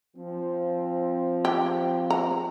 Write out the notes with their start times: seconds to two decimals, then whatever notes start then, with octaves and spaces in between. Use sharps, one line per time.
0.16 F3 C4
1.45 G4
2.10 A#5